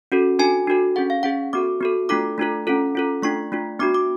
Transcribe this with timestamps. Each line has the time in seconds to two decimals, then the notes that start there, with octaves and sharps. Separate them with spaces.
0.12 C#4 F#4 A4
0.39 D4 F#4 A4 G#5
0.67 D4 F#4 A4
0.96 C#4 G#4 F#5
1.10 F5
1.23 C#4 G#4 F#5
1.53 B3 F#4 A4 D6
1.81 B3 F#4 A4
2.09 A3 D4 F4 A4 D6
2.38 A3 D4 F4 A4
2.67 C#4 F4 A4
2.95 C#4 F4 A4
3.22 A3 D4 F4 C#6
3.52 A3 D4 F4
3.79 B3 D4 F#4 D6
3.94 D6